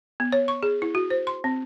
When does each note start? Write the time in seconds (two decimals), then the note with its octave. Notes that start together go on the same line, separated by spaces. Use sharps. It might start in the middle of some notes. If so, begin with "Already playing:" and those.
0.20 B3
0.32 C#5
0.48 C#6
0.63 G#4
0.82 E4
0.95 F#4
1.10 C5
1.27 C6
1.44 C4